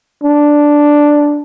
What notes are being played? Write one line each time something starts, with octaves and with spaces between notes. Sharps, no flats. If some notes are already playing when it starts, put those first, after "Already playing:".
D4